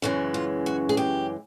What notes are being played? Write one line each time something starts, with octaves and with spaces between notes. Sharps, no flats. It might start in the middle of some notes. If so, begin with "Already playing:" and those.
F#2 C#3 E3 G#3
F4
F#4
G#4
G4